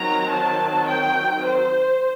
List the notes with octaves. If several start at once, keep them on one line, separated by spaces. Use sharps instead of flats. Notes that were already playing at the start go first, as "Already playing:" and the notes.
Already playing: D#3 F#3 C4 A#5
A5
G5
C5